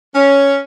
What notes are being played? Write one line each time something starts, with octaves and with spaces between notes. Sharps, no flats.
C#4